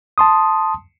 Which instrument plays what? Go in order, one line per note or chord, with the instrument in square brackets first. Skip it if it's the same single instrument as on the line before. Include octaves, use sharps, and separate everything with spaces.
[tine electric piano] A5 C6 D#6